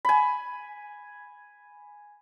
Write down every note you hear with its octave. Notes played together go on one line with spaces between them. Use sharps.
G#5 B5